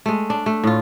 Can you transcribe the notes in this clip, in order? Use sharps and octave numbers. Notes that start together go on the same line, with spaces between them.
G#3 A3
D4
A3
A2 F4